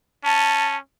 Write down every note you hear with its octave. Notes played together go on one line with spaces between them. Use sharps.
C#4 A5